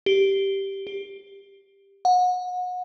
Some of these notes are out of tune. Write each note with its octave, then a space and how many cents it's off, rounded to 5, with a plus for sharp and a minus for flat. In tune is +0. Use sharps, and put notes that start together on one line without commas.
G4 -5
G4 +15
F#5 -30